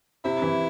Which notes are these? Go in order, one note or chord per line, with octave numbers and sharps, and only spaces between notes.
C3 E4
E3